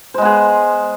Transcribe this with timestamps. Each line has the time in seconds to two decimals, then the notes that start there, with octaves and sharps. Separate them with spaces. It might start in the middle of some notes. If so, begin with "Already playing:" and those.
0.14 C5
0.18 G#3
0.22 B3
0.25 G#4